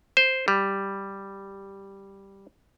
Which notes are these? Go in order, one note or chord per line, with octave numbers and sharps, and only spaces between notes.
C5
G3